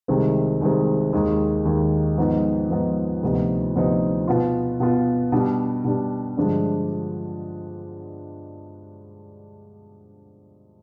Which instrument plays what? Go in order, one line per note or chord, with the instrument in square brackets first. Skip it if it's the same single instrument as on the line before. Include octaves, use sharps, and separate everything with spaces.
[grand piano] C2 C3 D#3 G#3 C4
C2 C3 D#3 G#3 C4
D#2 D#3 G#3
D#2 D#3 G#3
G#2 F3 B3 D#4
G#2 F3 B3 D#4
D2 C3 F3 B3 D#4
D2 C3 F3 B3 D#4
B2 B3 F4
B2 B3 F4
B2 G3 D4
B2 G3 D4
G2 D3 F3 G#3 D4